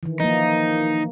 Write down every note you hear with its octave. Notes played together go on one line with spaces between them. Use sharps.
D#3 E3
F3 A#3 D#4